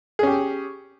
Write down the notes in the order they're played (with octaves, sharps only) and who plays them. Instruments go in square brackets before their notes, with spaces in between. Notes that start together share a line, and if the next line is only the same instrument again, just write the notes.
[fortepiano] G#4
C#4
G4